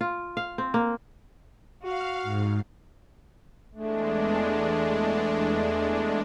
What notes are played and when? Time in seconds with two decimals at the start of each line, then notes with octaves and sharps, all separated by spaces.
0.01 F4
0.37 F5
0.58 C4
0.74 A#3
1.83 F#4 F5
2.23 G#2
3.75 E2 G#3 A3 D4